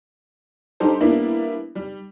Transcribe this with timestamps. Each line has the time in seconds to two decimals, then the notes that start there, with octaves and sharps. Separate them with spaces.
0.80 G3 D4 D#4 G4 A4 C5
1.00 G3 A#3 B3 D4 E4
1.75 G3